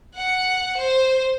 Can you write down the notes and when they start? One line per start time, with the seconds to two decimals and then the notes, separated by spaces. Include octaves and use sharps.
0.15 F#5 C#7
0.78 C5